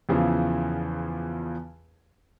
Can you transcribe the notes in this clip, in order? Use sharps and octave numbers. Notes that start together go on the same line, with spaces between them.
E2 C#3 E3 F3